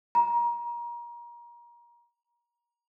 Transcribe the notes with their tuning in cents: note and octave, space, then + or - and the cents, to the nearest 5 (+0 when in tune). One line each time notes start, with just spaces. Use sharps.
A#5 +30